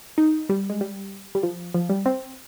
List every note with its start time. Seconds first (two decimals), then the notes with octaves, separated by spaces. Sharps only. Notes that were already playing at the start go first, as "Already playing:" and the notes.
0.18 D#4
0.49 G3
0.70 G#3
0.81 G3
1.35 G3
1.43 F3
1.74 F3
1.89 G3
2.06 C4